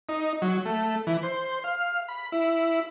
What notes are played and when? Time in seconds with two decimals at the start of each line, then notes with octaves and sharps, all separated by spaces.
0.09 D#4
0.42 F#3
0.65 A3
1.07 E3
1.23 C5
1.64 F5
2.09 B5
2.32 E4